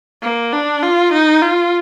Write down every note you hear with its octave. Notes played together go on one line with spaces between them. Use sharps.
A#3
D4
F4
D#4
F4